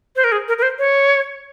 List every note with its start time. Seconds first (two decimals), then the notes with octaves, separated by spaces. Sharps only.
0.16 C5
0.24 A#4
0.32 G#4
0.48 A#4
0.58 A#4
0.62 C5
0.79 C#5